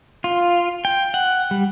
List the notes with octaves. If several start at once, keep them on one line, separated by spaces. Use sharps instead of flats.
F4
G5
F#5
G3